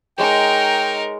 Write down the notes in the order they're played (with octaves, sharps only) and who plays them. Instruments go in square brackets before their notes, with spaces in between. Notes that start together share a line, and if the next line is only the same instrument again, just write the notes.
[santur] G#3 C#5 [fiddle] D#4 A#4 [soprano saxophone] G5